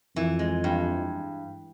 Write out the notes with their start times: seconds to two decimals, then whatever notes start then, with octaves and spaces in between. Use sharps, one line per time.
0.16 F2 E3
0.39 G#3
0.64 G2